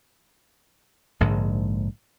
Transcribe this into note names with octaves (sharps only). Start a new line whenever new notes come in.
A#1 G#2 D3 G#3